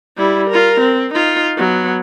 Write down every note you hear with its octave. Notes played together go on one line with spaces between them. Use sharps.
G3 E4
F4 A#4
C4
D#4 F4
F#3 B3